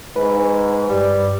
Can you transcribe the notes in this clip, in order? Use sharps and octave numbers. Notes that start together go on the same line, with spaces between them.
G#2 B4
G2 G3